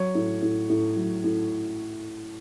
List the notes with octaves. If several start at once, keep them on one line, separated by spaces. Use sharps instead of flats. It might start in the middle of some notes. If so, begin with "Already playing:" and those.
Already playing: F#3 C#5
A2
A2
A2
F#3
A2